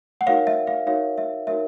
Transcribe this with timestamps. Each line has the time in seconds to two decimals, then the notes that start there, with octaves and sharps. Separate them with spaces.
0.21 F#5
0.26 D#4 F#4 A#4 C#5 F5
0.47 E5
0.67 F5
0.87 D#4 F#4 A#4 C#5 F5
1.18 E5
1.47 D#4 F#4 A#4 C#5 E5